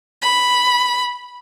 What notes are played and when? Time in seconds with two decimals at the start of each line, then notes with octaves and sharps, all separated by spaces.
0.22 B5